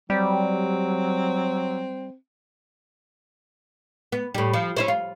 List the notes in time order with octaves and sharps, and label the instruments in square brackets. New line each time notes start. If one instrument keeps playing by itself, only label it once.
[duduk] F#3 [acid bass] G3 [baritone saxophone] C4
[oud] B3
A2 G3
F3
C#4 E4 C5
F4